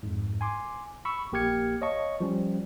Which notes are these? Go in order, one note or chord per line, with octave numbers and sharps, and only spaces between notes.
F2 G#2
G#5 C6 D6
B5 C#6 E6
A#1 A#3 G4 F6 G#6 C#7
C#5 D#5 F5 A5 C#6
F3 G3 C#4